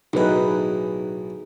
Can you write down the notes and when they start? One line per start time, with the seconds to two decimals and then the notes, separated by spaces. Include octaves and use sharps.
0.13 B1 A2 D#4 G#4 B4